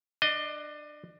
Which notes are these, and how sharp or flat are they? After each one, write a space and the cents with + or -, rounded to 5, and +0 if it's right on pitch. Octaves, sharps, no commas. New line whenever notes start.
D4 +20 D#5 +0